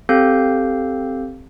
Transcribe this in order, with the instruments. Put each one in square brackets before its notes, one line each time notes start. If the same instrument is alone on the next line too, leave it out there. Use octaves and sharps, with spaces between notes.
[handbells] C4 G4 A4 F5 G6